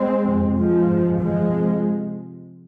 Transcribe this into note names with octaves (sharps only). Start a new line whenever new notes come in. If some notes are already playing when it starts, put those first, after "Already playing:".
Already playing: G#3 C4
F2 C3
F3 G#3
G2
F3 G#3
C3